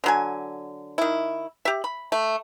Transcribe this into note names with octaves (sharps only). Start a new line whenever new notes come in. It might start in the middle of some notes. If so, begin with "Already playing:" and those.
D3 F#3 G#5
D#3 E4
G4 E5
B5
A3